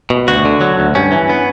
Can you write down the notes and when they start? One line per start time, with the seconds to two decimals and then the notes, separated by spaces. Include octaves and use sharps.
0.10 B2
0.28 D2 F#4
0.45 D3
0.61 F#3
0.79 D2
0.95 G2 C#4
1.12 E3
1.29 B3